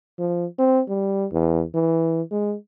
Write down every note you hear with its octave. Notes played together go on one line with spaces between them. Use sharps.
F3
C4
G3
E2
E3
G#3